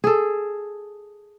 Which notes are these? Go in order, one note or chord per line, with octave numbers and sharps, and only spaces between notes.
G#4 A4